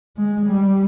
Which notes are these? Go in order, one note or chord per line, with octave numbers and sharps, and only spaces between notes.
G#3
G3